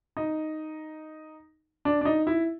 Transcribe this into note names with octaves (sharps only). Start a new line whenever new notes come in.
D#4
D4
D4
D#4
E4